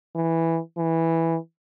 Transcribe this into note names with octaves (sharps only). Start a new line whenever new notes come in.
E3
E3